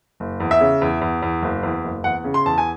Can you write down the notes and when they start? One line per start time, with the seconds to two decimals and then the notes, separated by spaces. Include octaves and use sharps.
0.20 F#1
0.40 E2
0.51 E5
0.61 C#3
0.82 E2
1.01 E2
1.22 E2
1.42 F#1
1.63 E2
1.84 F#1
2.04 E2 F#5
2.24 C#3
2.34 C6
2.45 E2 A5
2.58 G#5